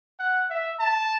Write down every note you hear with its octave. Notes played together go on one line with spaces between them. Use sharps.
F#5
E5
A5